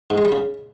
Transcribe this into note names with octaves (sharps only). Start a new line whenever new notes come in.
G#2
G#3
G3
C#3